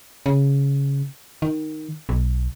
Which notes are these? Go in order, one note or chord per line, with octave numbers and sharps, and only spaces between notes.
C#3
D#3
B1